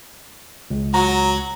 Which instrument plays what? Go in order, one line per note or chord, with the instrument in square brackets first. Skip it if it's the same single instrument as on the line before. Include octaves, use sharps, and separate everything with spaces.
[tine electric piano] C#2
[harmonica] F#3 F#4 [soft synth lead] A#5